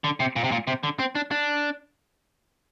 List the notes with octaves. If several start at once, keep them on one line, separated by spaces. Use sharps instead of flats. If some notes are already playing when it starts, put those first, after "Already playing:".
D3
C3
A#2
C3
A#2
C3
D3
C4
D4
D4